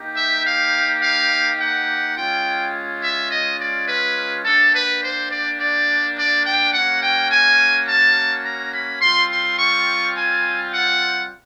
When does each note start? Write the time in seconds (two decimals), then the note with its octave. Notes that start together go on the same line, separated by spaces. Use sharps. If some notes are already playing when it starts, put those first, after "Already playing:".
Already playing: A#3 D#4 G4
0.17 E5
0.45 F5
1.02 F5
1.60 F#5
2.17 G#3 C#4 F4 G5
3.02 E5
3.31 D#5
3.59 D5
3.88 B4
4.45 A#3 D4 G4 A4
4.73 B4
5.02 C5
5.31 D5
5.60 D5
6.16 D5
6.45 G5
6.74 A#3 C#4 F#4 F#5
7.02 G5
7.31 G#5
7.88 A5
8.45 A#5
8.73 B5
9.02 G3 C4 F4 C6
9.31 C6
9.59 C#6
10.16 G#5
10.73 F#5